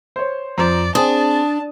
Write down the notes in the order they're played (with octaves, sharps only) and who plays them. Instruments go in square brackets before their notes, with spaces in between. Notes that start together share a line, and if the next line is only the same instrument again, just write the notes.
[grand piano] C5 C#5
[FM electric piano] F2 [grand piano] F3 C5 A#5 [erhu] D5
[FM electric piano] C4 G#4 C5 [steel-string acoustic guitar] D4 [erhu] A5 [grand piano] D#6